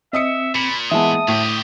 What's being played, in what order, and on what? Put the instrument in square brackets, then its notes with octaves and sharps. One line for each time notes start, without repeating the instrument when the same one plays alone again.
[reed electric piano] C4 [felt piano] D#5 D#6 C#7 [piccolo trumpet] E5
[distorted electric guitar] A#2 [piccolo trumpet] B5 [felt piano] C#7
[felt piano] E3 G#3 B3 [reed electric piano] E5 A5 [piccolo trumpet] D#6
[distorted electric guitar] D2 G4 [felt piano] A2